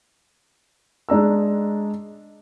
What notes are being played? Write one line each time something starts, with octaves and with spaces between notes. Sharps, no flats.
G#3 D4 A#5 E6